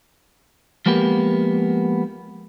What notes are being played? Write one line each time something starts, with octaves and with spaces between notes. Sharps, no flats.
F3 G#3 A#3 B3 G4